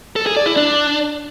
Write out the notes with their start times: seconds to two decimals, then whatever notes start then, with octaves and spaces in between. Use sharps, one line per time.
0.16 A4
0.26 G#4
0.36 D5
0.47 E4
0.57 D4